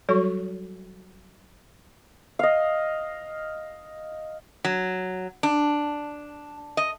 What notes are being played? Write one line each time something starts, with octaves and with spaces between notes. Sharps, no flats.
F#3 G3 F#4 A4 C#5
D#5 F5
F#3
D4
D#5